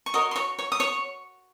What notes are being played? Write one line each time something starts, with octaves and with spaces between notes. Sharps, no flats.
C#6
F#4 A#4 C#5 D#5 D#6
C6
C#5 C#6
C#5 C#6
D#6
C#5 C#6